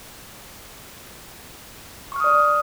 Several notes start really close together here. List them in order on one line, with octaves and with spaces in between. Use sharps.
C#6 F6 D#6 D5